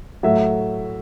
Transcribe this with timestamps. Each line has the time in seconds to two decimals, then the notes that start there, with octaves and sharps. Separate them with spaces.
0.23 A2 F#3 A3 E5